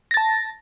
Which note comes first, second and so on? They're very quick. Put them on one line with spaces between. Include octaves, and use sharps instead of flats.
A#6 A6 A5